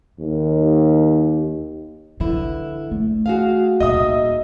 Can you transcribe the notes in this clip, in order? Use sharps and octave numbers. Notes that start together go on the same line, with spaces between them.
D#2
D3 E3 E4
A3
F#4 G#4 F5
D#1 D#4 D#5 E5 D#6